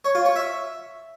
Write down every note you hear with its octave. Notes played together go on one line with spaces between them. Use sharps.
C#5
F4
C#5
E5